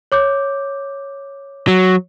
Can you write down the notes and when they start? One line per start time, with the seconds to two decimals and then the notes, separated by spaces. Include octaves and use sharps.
0.12 C#5 D6 G6
1.68 F#3